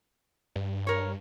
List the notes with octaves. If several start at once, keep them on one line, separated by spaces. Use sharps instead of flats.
G2
A#4 C#5